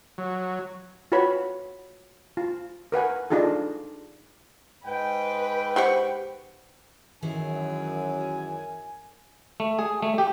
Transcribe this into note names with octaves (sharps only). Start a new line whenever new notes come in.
F#3
F4 F#4 B4 C#5 B5
F4
A#4 B4 F#5 G#5
D4 D#4 F4 G#4 A4
G#2 B4 G5
G4 C5 F#5 C#6
F#2 D#3 E3 G#4 G#5
A3
G#4
A3
G4